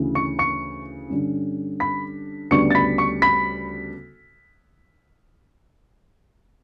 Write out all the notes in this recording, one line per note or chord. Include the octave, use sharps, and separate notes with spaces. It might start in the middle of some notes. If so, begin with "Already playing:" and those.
Already playing: D2 C#3 E3
C#6 C#7
C#6 C#7
G2 D3 G3 C#4
B5 B6
D2 C#3 G3 B3 D4 C#6 C#7
A6
B5 B6
C#6 C#7
B5 B6